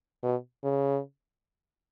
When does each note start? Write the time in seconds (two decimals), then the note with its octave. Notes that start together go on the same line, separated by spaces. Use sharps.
0.23 B2
0.64 C#3